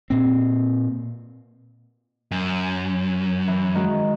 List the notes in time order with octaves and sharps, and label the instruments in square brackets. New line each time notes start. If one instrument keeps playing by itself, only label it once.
[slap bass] A#2 C4
[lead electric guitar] F#2 [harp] G#5
[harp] E3
D#3 G#3 F#4